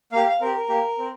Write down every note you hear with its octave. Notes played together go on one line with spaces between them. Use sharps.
A#3 G4 F5
F5
C4 G4 A#4
A#4
A#3 G4
C4